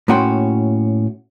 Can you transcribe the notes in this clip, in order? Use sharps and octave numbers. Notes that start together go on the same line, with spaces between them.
A2 A#3 C#4 F#4 G5 C6